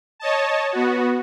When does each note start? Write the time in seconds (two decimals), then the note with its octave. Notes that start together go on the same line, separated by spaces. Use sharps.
0.20 C#5 D#5 A5
0.73 B3 F#4